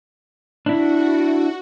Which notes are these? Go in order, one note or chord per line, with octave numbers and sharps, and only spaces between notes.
D4 E4 F#4